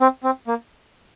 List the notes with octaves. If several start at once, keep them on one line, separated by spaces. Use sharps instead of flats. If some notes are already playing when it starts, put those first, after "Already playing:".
C4
C4
A#3